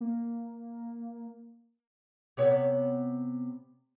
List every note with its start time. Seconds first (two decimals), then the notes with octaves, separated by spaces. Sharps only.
0.01 A#3
2.37 C3 B3 C#5